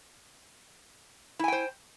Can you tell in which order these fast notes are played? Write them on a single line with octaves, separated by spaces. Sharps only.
E4 G#5 G5 C5